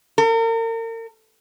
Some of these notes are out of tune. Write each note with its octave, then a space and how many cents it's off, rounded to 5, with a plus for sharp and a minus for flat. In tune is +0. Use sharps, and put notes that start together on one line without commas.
A#4 -40